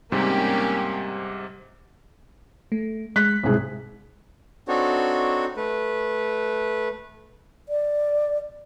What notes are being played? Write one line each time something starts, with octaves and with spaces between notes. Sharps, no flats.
G#2 C3 G3 A#3 C#4 G4
A3
G#3 F#6 B6
C2 G#2 B2 G#4
C4 D4 D#4 F#4 A4 C#5
A3 B4
D5